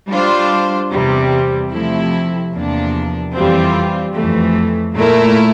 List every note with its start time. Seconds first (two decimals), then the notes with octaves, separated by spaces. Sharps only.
0.11 G3 D4 F4 C5
0.92 E2 C3 G3 C4
1.72 C3 F3 A3 E4
2.53 E2 C3 F3 A#3 D4
3.34 F2 E3 G3 C4 F4
4.15 F2 E3 A3
4.96 A#2 A3 E4 A#4